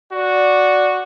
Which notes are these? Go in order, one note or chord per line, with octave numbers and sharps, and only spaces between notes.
F#4 D5